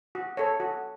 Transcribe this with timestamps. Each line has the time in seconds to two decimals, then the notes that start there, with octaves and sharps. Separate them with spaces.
0.15 F#4
0.37 A4 C#5
0.60 F#4